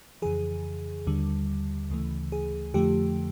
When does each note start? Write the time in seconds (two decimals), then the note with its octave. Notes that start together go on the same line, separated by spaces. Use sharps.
0.22 F2 C#3 E3 G#4
1.07 D#2 D3 G3
1.90 D2 C#3 E3 A3
2.32 G#4
2.74 F2 D3 F3 A3 G4